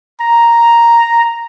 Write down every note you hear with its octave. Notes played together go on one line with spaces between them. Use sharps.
A#5